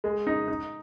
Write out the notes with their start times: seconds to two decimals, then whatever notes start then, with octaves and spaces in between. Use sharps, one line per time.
0.04 G#3
0.27 D#4
0.48 D#4